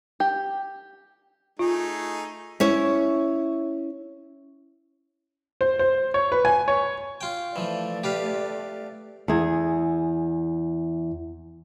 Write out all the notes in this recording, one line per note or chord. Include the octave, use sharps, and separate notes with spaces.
G4
A3 D#4 F4 G#4
C#4 E4 C#5
C5
C5
C#5
B4
G#5
C#5
F4 G5
E3 F3 A3 D5
G4 B4 F5
E2 G#4